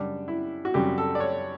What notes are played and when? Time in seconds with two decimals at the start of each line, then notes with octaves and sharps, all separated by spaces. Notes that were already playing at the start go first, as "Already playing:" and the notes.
Already playing: F#2 C#3 G3 D4
0.28 E4
0.65 F#4
0.74 F#2 C#3 G3 G4
0.98 A4
1.15 D5
1.20 C#5